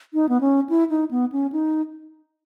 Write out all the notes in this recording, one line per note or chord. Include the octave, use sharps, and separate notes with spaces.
D#4
B3
C#4
E4
D#4
B3
C#4
D#4